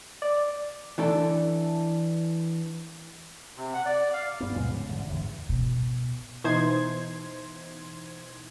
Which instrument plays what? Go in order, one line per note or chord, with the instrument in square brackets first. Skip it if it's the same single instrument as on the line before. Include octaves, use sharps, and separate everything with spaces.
[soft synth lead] D5
[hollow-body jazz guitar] E3 D4 A4
[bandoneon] C3
F#5
D5
F5
[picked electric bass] G2 B3
D#2 B2 F3 G#3
G#2 C#3
A1 G#2 D3
A1 E2
[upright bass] B2
[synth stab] B2 E3 D#4 C5 C6 G#6